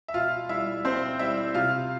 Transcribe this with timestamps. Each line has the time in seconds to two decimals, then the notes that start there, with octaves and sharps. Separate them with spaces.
0.08 E5
0.14 B2 F4 F5
0.49 G3 E4 E5
0.84 B2 C4 C5
1.19 G3 E4 E5
1.54 C3 F4 F5